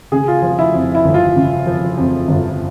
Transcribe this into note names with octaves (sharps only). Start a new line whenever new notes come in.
C#3 G#4
F4
F3 F4
E4
F2
E4
G1
F4
C#3
F3
F2
G1